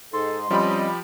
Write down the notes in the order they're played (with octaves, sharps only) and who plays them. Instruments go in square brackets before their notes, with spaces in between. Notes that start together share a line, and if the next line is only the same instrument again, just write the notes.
[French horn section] G#2 D#4 [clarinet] A4 [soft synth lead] C6
[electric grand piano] F3 G4 B5 [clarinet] G3 [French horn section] C4 C#4 D#5